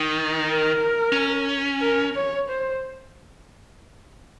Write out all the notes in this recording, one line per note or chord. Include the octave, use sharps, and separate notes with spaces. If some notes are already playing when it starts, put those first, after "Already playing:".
Already playing: D#3
A#4
C#4
A#4
C#5
C5